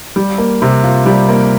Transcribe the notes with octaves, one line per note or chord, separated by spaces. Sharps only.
G3
A#3
C3
F4
G3
A#3